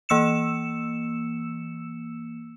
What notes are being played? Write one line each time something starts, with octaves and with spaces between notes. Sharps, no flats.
E3 A#3 E6 C#7 E7